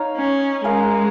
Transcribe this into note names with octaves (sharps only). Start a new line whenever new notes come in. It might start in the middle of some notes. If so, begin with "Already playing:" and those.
Already playing: D#4 C#5 F5
C#4
G#3 C#4 A#4 F5